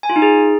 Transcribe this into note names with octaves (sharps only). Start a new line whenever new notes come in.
G#5
F4
D#4
G#4